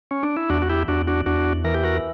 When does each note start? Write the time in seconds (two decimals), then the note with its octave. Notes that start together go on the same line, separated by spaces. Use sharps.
0.11 C#4
0.23 D4
0.37 E4
0.50 E2 D4 F#4
0.62 F#4
0.70 E4 G4
0.88 E2 D4 F#4
1.07 D4 F#4
1.26 E2 D4 F#4
1.64 E3 A#4
1.74 G4
1.83 F#4 A#4